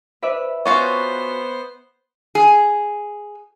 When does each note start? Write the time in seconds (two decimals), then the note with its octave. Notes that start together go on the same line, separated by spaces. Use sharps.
0.23 B4 C5 D5 E5 F5
0.66 B3 C#4 F4 F#4 C5 C#6
2.35 G#4